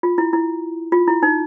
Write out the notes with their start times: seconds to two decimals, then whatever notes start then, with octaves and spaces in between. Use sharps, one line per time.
0.03 F4
0.18 E4
0.33 E4
0.92 F4
1.08 E4
1.23 D#4